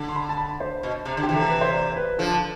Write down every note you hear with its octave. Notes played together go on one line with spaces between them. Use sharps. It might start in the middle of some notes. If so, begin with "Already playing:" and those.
Already playing: D3
C6
B5
A5
B5
C5
B2
C3
D3
G4
C3 E3
A4
B4
C5
D5
B4
D3 F3 A4